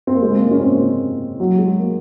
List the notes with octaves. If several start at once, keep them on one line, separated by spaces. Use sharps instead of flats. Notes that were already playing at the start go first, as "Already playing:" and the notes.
C4
A#3
G#3
A#3
C#4
C4
A#3
F#3
G#3
A#3